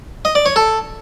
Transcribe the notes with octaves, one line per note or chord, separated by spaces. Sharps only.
D#5
D5
C#5
A4